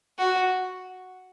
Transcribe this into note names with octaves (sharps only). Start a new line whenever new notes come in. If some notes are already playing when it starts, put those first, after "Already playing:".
F#4